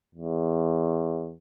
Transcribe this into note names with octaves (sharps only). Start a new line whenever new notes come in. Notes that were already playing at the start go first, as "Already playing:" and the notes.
E2